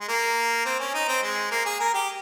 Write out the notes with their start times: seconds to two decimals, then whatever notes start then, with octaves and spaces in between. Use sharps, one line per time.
0.01 G#3
0.08 A#3
0.65 C4
0.79 C#4
0.94 D#4
1.08 C4
1.23 G#3
1.51 A#3
1.66 G#4
1.80 A#4
1.94 G4